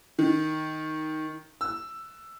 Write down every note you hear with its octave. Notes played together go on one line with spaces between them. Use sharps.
D#3
E6